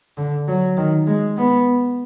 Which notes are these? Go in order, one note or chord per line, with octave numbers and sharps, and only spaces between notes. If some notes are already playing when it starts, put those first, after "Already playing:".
D3
F#3
D#3
G#3
B3